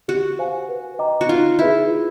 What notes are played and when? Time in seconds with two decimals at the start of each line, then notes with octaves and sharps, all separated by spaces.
0.08 F#4 G4
0.39 C5 F5 G#5
0.69 B4
0.99 D#5 G5 A#5 D6
1.21 F#4
1.28 D#4 F4
1.59 E4 G#4 B4 E5
1.89 F4